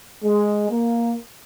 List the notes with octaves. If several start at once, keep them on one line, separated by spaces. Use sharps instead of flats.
G#3
A#3